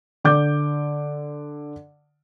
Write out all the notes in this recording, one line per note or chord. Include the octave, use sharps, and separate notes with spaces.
D3 D6 G6